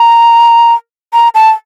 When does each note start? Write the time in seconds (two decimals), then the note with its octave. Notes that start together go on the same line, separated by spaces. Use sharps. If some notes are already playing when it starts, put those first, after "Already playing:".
Already playing: A#5
1.13 A#5
1.35 A5